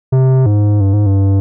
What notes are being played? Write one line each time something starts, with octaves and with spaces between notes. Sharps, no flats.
C3
G#2
G2
G#2
G2